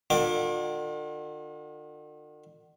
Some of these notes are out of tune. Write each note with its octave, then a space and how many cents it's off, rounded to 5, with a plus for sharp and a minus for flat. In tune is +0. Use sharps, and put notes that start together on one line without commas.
D3 +45 F4 +45 D6 +0